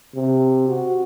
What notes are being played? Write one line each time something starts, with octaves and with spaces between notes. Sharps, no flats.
C3
F#4